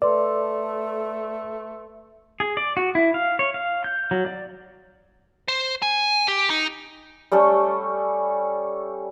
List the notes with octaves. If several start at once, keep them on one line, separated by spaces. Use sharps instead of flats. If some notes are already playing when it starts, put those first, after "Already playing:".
A3 A4 B4 D5 C6
G#4
D5
F#4
E4
F5
C#5
F5
G6
F#3
D5
C5
G#5
G4
D#4
G3 A3 C#4 A4